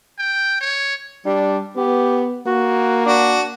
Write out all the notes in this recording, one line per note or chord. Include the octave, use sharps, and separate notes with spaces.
G5
C#5
G3 D4
B3 G4
A#3 F#4
D4 F#4